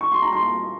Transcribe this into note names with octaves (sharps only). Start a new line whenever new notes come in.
C#6
C6
A#5
C6